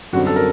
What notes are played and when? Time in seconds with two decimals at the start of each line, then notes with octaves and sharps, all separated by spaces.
0.13 F#2 D3 G3 C4 F#4
0.27 A4
0.36 A#4